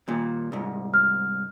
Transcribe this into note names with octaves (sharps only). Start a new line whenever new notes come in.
D#2 A#2
C2 G#2
F6